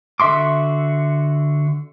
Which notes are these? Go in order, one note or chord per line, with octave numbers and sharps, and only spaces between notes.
D3 F#4 E5 C6 D6